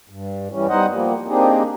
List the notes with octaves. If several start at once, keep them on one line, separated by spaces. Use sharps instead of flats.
G2
E3 G3 C#4
G3 B3 D#4 C5 D#5 F#5
F3 G3 A#3
A#3 C4 D4 D#4 G4 G#4